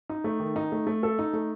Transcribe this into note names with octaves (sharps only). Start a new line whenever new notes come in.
D#4
A3
D#3
D#4
A3
A3
A4
D#4
A3